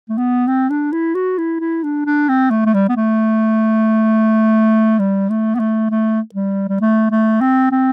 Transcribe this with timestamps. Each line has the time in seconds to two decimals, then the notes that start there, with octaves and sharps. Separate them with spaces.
0.09 A3
0.18 B3
0.47 C4
0.70 D4
0.92 E4
1.15 F#4
1.38 E4
1.60 E4
1.84 D4
2.06 D4
2.28 C4
2.50 A3
2.66 A3
2.74 G3
2.89 B3
2.96 A3
4.99 G3
5.29 A3
5.55 B3
5.59 A3
5.90 A3
6.35 G3
6.68 G3
6.81 A3
7.11 A3
7.41 C4
7.71 C4